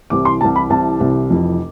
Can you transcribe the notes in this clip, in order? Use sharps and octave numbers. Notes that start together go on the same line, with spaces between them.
C2 C3 E3 D6
C6
C2 C3 E3 A5
B5
C2 C3 E3 A5
C2 C3 E3
F1 F2 E3